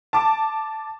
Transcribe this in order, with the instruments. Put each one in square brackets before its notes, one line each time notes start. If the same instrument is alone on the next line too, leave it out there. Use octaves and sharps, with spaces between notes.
[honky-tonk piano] A5 D6